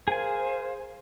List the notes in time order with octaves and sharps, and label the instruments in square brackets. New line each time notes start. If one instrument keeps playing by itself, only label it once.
[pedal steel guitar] G#4 G#5 [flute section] A#4 C5 F5